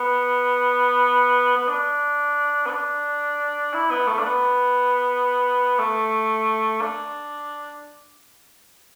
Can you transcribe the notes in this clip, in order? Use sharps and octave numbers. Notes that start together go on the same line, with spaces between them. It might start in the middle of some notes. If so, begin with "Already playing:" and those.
Already playing: B3
B3
D4
B3
D4
E4
B3
A3
D4
B3
A3
D4